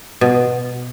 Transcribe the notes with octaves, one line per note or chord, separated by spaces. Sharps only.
B2